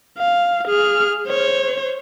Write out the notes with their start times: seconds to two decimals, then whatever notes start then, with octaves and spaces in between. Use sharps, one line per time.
0.18 F5
0.67 G#4 F6
1.27 C5 C#5